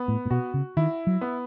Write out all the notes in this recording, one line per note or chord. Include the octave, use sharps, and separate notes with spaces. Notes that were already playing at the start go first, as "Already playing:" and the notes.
Already playing: B3
A2
A2
B2 F#4
C#3
D#3 E4
F#3
B3